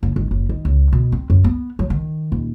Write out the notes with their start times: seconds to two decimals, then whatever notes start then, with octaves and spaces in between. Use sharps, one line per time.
0.03 F#1
0.16 G#1
0.31 F#1
0.49 D#3
0.65 C#2
0.93 B2
1.12 C4
1.30 F#2
1.44 B3
1.79 F#3
1.90 D#3
2.32 D#1